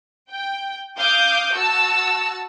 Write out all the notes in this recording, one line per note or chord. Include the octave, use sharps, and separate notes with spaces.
G5
F5 D6 D#6 G6
F#4 A5 E6